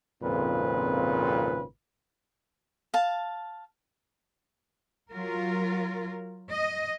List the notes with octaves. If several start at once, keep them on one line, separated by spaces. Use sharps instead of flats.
G#1 F2 A#2 C#3 C4 B4
F5 A5
F#3 F4 A#4
D#5